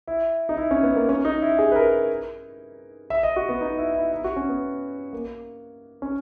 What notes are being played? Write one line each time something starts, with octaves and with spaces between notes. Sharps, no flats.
E4
D#4
E4
C#4
B3
A#3
C#4
D#4
E4
G#4
B4
A#4
E5
D#5
F#4
B3
D#4
E4
E4
E4
F#4
C#4
B3
A#3
C#4